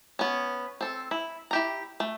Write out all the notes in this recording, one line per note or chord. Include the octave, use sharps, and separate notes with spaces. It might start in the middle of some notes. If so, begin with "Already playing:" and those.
B3 C#4
C4 A4
E4
E4 G4 A#5
A3